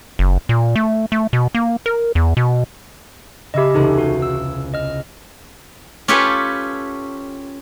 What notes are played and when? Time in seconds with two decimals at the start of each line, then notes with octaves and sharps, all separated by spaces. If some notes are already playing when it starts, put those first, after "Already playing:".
0.19 F#1
0.49 A#2
0.76 A3
1.12 A3
1.33 B2
1.55 A#3
1.86 A#4
2.15 E2
2.37 B2
3.54 C#3 G4 D#5 E5 B5
3.74 E1 C#2 C3 D#4 A4
3.98 F#4
4.22 E6
4.74 D#5 F6
6.08 C#4 F4 G4 A4 B4 C#5